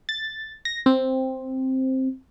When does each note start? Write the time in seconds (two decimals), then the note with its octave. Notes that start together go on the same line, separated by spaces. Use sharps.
0.09 A6
0.65 A#6
0.86 C4